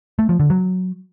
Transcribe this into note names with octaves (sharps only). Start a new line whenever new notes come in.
A3
F3
D3
F#3